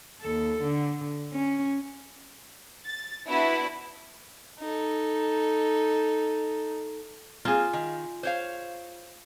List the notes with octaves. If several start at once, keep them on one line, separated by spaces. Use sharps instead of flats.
D#2 A4
D3
C#4
A6
B3 D4 E4 F#4 B4
D#4 A4
A#3 C4 F4 G#4
D#3
C5 C#5 F5